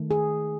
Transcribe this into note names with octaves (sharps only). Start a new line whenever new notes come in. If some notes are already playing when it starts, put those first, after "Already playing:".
Already playing: D#3 A3
G#4